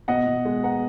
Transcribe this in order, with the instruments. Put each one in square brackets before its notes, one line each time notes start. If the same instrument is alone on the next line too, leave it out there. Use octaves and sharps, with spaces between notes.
[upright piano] B2 D#5 F#5
B2
G#3
B3 F#5 A#5